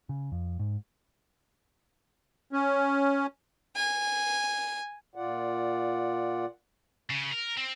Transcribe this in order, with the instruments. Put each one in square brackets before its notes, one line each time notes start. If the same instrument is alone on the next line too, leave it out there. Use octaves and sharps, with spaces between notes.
[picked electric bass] C#3
F2
G#2
[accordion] C#4
[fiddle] G#5
[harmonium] A#2 F4 D5 F#5
[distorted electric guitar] C#3
A#4
C4